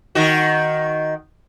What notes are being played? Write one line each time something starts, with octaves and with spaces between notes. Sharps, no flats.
D#3 F#4